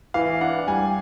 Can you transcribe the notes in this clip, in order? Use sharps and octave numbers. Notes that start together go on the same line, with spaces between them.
E3 F5
D4 F#5
G3 G#5